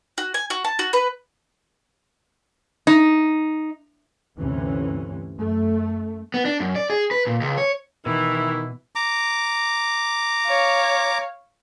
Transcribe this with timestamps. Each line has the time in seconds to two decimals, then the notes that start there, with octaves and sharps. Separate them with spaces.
0.18 F#4
0.34 G#5
0.50 F#4
0.65 A5
0.79 F#4
0.93 B4
2.87 D#4
4.37 D2 G2 C3 E3 C#4
5.36 F#2 A3
6.34 B3
6.45 D4
6.60 F#2
6.76 D5
6.90 G#4
7.11 B4
7.27 A#2
7.41 C#2
7.58 C#5
8.06 B2 D#3 E3 E4
8.95 A#5 D6
10.46 C#5 F5